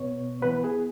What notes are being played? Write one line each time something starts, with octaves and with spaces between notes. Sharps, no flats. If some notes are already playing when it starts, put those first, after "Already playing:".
Already playing: B2 B3 C#5
E3 B3 B4
G#4